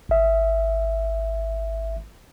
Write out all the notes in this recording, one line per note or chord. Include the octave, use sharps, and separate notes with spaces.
G#1 E5